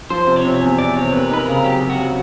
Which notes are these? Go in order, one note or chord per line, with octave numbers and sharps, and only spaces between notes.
F3 C5
C3
C#5
C3
E2
E2 D5
C3 C#5
A#3 B4
D#4 B4
A#4
C#3
F#3 G4
F#3
F#4
F#3